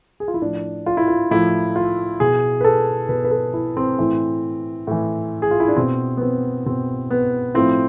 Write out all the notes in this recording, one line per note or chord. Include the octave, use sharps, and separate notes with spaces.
G#4
F4
E4
A2 F3 D4
F4
E4
F4
A2 F3 E4
F4
B2 G#4
B4
A4
B2 B4
B4
A4
E4
C4
A2 E3
A2 E3
G#4
F4
E4
D4
B2 C4
B3
C4
B2 C4
B3
A2 F3 C4